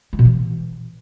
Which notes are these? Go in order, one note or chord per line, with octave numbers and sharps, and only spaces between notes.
G#3
B2
E3